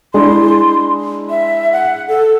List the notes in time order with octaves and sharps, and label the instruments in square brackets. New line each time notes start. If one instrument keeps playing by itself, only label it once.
[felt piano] G#3 D4 E4 [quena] C6
[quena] E5
F#5
A4